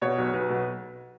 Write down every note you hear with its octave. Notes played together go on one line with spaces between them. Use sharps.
B2 C#5
B1
B1 B4
B2